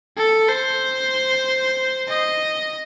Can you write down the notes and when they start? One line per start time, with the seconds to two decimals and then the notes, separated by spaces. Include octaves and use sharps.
0.17 A4
0.49 C5
2.08 D#5